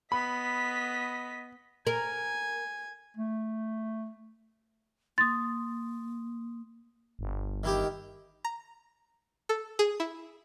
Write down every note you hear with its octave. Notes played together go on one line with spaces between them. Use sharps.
B3 D#5 B5 B6
A#4 G#5
A3
A#3 C6 D#6 A6
G1
D#3 E4 G4
A#5
A4
G#4
E4